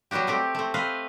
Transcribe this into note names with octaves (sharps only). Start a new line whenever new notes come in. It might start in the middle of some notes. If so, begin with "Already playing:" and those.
F#3 G3 B3 F#4 G4
A3 C4 G4
A3 C4
C4 B4 D#5 F5